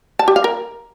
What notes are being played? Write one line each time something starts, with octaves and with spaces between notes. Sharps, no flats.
A5
G4
F5
A#4